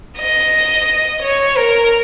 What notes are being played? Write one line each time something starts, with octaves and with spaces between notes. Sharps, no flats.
D#5
C#5
A#4